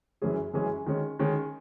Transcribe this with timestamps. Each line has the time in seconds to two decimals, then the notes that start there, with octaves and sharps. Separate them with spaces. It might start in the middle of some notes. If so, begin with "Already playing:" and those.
0.22 F#2 E3 G#3 C#4 G#4
0.54 F#2 E3 G#3 C#4 G#4
0.86 D#3 G#3 C#4
1.19 D#3 G#3 C#4